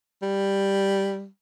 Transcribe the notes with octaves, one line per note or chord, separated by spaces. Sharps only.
G3